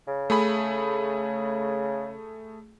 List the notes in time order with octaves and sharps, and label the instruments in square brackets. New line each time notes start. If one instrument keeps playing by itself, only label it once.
[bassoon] C#3
[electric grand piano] A3 G#4 B5